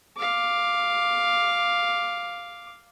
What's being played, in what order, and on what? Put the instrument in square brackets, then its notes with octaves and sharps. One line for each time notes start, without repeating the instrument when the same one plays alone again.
[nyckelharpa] F5 D6